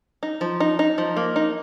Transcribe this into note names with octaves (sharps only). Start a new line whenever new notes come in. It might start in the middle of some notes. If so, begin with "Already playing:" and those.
D#4
F3
D#4
D#4
F3
A#3
D#4